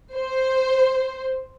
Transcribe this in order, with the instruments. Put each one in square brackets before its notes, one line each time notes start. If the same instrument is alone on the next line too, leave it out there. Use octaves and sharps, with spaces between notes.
[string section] C5